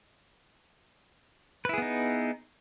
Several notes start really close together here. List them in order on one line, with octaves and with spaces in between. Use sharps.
B4 E4 G#4 B3 D#4